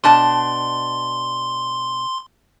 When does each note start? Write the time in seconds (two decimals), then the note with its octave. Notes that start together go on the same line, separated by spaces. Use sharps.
0.04 B2 D4 A5 C6